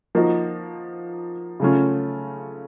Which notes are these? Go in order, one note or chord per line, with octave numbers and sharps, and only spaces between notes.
F3 A#3 D#4 F#4
C#3 F#3 A3 C#4 F4